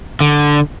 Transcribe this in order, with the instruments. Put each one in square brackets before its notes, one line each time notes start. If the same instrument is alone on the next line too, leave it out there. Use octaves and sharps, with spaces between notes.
[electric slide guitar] D3